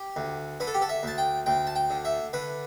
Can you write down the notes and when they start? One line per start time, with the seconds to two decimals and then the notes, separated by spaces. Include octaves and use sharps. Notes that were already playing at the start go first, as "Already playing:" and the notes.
Already playing: G4
0.16 D2
0.60 D3 B4
0.67 A4
0.74 G4
0.82 A4
0.89 E5
1.03 D2 A5
1.18 G5
1.46 D2 G5
1.67 A5
1.76 G5
1.90 D3
2.05 E5
2.33 D3 B4